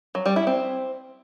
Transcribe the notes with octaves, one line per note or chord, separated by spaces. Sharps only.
F#3
G3
E4
C4